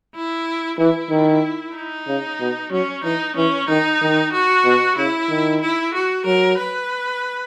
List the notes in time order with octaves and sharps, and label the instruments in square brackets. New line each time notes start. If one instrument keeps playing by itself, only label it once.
[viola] E4
[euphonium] E3 [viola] E4
[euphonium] D#3
[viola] D#4
[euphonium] C#3
B2
[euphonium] F#3 [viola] C#4
[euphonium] E3 [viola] D#4
[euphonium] E3 [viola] C#4
[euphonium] D#3 [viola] D#4
[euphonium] D#3
[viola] F#4
[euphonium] B2
[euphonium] C#3 [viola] E4
[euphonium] D#3
[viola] E4
F#4
[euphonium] F#3 [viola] A#4
[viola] B4